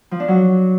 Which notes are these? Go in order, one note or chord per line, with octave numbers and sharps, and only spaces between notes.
F3
D4
F#3